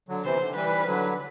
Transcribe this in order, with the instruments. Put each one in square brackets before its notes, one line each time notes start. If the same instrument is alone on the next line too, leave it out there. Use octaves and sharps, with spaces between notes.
[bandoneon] D3 F#3
[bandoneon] C3 E3 [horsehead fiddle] C5
[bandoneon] D3
[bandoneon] E3 G3 [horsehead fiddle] B4
[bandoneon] D3 F#3